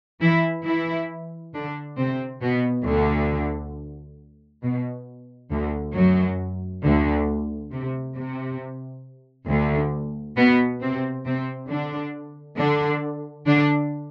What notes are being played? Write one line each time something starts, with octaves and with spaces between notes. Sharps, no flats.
E3 E4
E3 E4
D3 D4
C3 C4
B2 B3
D2 D3
B2
D2 D3
F#2 F#3
D2 D3
C3
C3
D2 D3
B2 B3
C3 C4
C3 C4
D3 D4
D3 D4
D3 D4